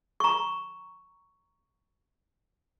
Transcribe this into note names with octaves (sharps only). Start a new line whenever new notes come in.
A#5 C#6